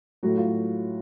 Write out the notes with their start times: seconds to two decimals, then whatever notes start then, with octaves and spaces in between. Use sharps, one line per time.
0.23 A2 F#3 F#4
0.38 F4